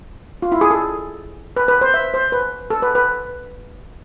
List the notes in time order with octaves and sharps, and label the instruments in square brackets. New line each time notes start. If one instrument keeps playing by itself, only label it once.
[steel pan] F4
E4
G#4
A4
B4
B4
C5
E5
C5
B4
A4
B4
B4